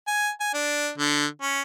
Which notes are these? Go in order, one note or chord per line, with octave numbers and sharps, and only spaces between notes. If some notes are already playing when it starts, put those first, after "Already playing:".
G#5
G#5
D4
D3
C#4